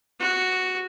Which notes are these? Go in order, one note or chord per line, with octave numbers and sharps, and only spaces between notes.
F#4